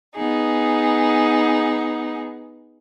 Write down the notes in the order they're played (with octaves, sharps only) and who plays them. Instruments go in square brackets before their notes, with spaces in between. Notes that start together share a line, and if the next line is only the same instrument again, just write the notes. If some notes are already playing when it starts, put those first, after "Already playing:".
[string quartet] B3 D#4 G#4